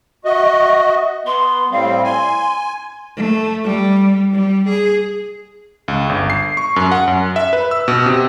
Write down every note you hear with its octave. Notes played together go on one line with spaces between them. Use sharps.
F#4 D#5 E5
B3 C6
A2 G3 C4 F5
G#5 C6
A3
G3
G3
G#4
C#2
G1
C7
C#6
F#2
F#5
F#2
E5
B4
E6
B2
C3